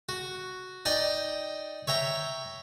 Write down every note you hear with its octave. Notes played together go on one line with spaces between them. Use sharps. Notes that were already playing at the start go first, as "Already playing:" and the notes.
F#4
D#4 D5 G5
C#5 E5 G5 A#5